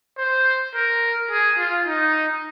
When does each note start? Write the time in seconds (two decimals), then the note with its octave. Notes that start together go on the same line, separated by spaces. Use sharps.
0.18 C5
0.74 A#4
1.30 G#4
1.58 F4
1.87 D#4